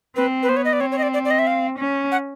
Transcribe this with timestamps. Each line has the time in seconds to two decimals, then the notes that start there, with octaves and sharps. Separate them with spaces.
0.16 C4 B4
0.43 B4
0.49 B3 C5
0.57 C#5
0.65 D#5
0.73 D5
0.80 C4 C#5
0.92 C#5
0.98 D#5
1.03 D5
1.14 D5
1.25 D5
1.31 D#5
1.39 E5
1.47 F5
1.79 C#4
2.12 F#5